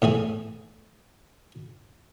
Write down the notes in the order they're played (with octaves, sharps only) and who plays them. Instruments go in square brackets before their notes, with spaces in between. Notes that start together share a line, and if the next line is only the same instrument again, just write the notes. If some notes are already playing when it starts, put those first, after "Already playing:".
[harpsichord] A2 E3 G#4 G#5